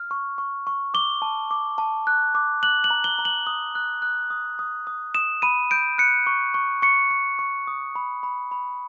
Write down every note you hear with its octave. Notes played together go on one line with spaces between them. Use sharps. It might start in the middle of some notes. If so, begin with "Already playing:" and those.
Already playing: F6
C#6
C#6
C#6
D6 G7
A5
D6
A5
F#6
D6
F#6 F#7
F#7
A#5
G7
A#5
F#7
D#6
F#6
F#6
D#6
D#6
D#6
D#6 E7
B5 D#7
G6 D7
F#6 C#7
C#6
C#6
C#6 C#7
C#6
C#6
D#6
B5
B5
B5